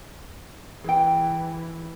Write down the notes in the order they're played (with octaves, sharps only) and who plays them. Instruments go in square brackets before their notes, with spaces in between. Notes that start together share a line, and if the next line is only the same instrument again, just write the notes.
[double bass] E3 [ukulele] G#4 G5